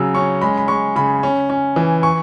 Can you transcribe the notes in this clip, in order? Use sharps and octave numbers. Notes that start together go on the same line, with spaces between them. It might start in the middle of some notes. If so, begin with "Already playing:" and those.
Already playing: C#3 F#3 E6
C#4 C#6
G#3 B5
B5
G#3 C#6
C#3 B5
C#4
C#4
E3
C#6